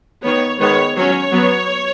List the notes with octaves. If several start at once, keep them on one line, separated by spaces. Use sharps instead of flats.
D#3 B3 C#5
D#3 G#3 B3 C#5
F#3 C#4 C#5
F#3 B3